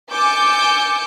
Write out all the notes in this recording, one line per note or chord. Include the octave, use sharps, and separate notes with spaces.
G#5 D6 E6 G6 A6 C#7